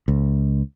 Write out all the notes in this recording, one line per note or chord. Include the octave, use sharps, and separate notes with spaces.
C#2